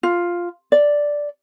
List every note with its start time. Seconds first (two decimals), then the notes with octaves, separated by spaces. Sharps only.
0.03 F4
0.72 D5